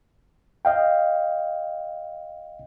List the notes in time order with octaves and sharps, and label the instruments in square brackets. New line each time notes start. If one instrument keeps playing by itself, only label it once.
[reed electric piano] D#5 F5 G5